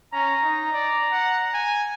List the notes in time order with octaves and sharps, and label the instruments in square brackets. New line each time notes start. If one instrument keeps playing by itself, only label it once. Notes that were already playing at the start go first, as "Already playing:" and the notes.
[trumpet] C#4 [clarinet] A#5
[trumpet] D#4
D5
F#5
G#5